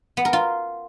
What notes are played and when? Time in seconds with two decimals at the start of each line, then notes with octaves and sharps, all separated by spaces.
0.17 B3
0.25 A#4
0.33 F4